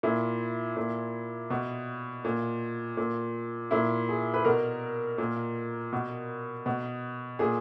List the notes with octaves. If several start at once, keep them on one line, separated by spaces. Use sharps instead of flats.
A#2 E4
A#2
B2
A#2
A#2
A#2 E4
G#4
B4
B2 A#4
A#2
B2
B2
A#2 G#4